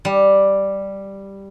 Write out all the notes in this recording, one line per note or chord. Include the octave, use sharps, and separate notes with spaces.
G3